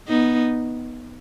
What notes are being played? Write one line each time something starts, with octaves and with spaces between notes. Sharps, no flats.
B3 D#4